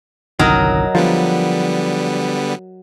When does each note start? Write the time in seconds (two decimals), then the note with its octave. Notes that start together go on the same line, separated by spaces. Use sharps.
0.39 G1 C2 D#3 F#3 A#4 D#5
0.95 D3 F3 G3 B3